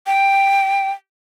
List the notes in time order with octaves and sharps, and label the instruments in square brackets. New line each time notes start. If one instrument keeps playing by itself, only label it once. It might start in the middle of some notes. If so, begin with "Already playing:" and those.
[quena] G5